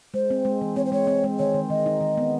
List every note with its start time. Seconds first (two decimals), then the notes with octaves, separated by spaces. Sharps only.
0.14 G#3 C5
0.30 C4
0.45 G#3
0.61 E3
0.76 C4 C#5
0.85 C5
0.92 G#3 C#5
1.07 C4
1.24 G#3
1.39 D#3 C#5
1.54 D#3
1.70 D#3 D#5
1.86 D#4
2.01 D#3
2.17 B3